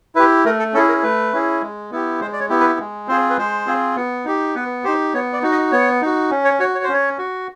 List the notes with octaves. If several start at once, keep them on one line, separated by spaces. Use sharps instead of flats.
E4 G4 B4
A3 A#4
A4
C#4 E4 G#4 A4
A#4
A3 B4
C#4 E4 G#4
G#3
B3 E4 G4
G#3 C5
D5
C#5
B3 E4 G4
B4
G#3
C4 F4 G#4 C5
B4
G#3 C5
C4 F4 G#4
B3
D#4 G4
B3 B4
D#4 G4 C5
B3 C#5
D5
D#4 F#4
D#5
B3 C#5
D#4 F#4
C#4
C#5
F#4 C#5
C#5
C5
C#4 C#5
F#4